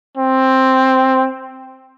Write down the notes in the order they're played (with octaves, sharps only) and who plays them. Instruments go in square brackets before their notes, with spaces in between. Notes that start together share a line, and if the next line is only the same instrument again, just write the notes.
[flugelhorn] C4